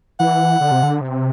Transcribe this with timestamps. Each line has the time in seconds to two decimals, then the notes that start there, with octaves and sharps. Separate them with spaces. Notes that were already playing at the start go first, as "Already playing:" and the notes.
0.20 E3 F#5
0.61 D3
0.71 C3
0.83 D3
1.01 C3